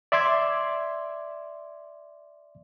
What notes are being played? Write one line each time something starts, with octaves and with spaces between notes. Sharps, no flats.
D5 E5 C6 D6 G#6